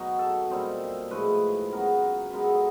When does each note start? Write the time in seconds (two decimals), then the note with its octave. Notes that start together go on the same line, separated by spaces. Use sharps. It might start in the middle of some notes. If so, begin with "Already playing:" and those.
Already playing: B2 F#3 D#4
0.19 A4
0.50 A#2 G3 C4 D#4
1.11 A2 F3 G#3 B4
1.72 C#3 F#3 B3 A#4
2.29 B2 G#3 B3 D#4 A#4 B4
2.44 A4
2.54 D#5